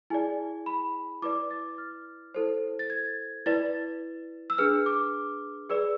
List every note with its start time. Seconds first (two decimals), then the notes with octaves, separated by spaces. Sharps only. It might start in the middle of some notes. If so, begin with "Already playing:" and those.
0.10 E4 G#4 D5 G#5
0.66 B5
1.22 E4 B4 D5 D6
1.51 A6
1.78 F6
2.35 E4 A4 C5
2.79 A6
2.90 G#6
3.46 E4 B4 D5 A6
4.50 E6
4.58 D4 G#4 B4 F6
4.86 D6
5.70 G#4 B4 D5 E6